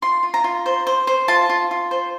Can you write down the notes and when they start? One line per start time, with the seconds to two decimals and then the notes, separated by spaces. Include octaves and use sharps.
0.02 F4 C6
0.23 F4
0.34 A#5
0.44 F4
0.66 C5
0.87 C5
1.07 C5
1.28 F4 A5
1.49 F4
1.71 F4
1.91 C5